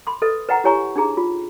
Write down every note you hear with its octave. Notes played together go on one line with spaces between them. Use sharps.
B5 C6 D6
A4 B4 D#5 E5
B4 D#5 F#5 G5 A#5
E4 G4 C#5 G#5 A#5 C#6
D4 D#4 G#4 A#5
F4